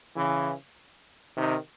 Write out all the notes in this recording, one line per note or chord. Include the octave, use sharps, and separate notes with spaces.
C#3 E3
C3 D#3